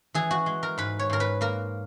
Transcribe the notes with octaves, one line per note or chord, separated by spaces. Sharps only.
E3 G#4
F#4
G#3
A#4
G#2 B4
C#5
G#2 A#4
B4
A#3 A#4